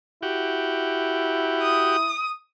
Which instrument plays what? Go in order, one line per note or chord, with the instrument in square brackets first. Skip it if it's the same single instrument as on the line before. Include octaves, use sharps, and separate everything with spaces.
[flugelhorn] E4 [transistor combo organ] F#4 G4
[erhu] D#6